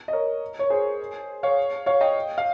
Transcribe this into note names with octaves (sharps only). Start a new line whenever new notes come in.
D#5
A#4 C#5
C#5
G#4 C5
C#5 F5
C#5 F5
D#5 G5
F5